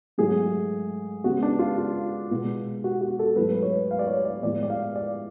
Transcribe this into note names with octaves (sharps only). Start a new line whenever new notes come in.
G#2 F#3 A3 G#4
C#3 G#3 B3 F#4
D4
F4
F4
B2 G#3 B3
F#4
F#4
A4
G#2 F#3 A3 B4
B4
C#5
F5
D5
C#5
D5
A2 F3 G#3 D5
D5
F5
D5